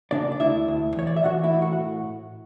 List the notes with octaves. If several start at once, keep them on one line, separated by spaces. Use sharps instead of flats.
C#3 D4 D5
D5
D2 E4 E5
D2
E3 C#5
D5
E5
E3 F#4 F#5
E4 E5
A2
F#4 F#5
F#5